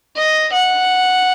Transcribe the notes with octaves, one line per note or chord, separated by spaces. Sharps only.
D#5
F#5